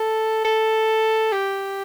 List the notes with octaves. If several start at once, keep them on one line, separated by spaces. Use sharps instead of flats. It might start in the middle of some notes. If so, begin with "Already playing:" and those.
Already playing: A4
A4
G4